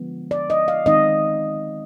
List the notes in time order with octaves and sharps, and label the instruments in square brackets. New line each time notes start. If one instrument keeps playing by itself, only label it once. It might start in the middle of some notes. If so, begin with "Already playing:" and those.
Already playing: [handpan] D3 F3 G#3 B3
D5
D#5
F5
D#3 G#3 C4 D#4 D#5